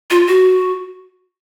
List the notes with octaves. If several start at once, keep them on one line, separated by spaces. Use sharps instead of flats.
F4
F#4